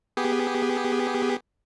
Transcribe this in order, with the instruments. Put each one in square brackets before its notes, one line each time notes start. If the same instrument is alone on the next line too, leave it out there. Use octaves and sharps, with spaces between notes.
[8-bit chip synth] B3 G4 G#4